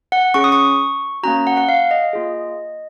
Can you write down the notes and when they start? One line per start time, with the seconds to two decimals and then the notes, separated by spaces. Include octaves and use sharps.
0.12 F#5
0.34 C#4 G#4 C#6
0.44 D#6
0.52 C#6
1.23 A#3 C#4 F#4 A#5
1.47 F#5
1.57 F#5
1.69 F5
1.91 D#5
2.13 A#3 F4 G#4